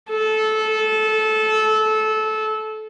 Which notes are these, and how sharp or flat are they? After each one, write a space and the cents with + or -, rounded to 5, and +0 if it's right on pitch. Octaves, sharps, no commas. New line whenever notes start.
A4 -20